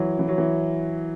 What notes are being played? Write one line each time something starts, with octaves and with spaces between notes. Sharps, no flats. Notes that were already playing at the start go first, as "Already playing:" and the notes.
Already playing: E3 F#3
E3
F#3
E3